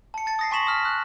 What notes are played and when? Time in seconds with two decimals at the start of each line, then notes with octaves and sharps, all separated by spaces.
0.14 A5 C#7
0.26 A5 A6 C#7
0.39 D#6 A#6 C7
0.51 G#5 C6 C#6 B6 E7 F#7
0.67 D#6 F6 B6
0.85 F#6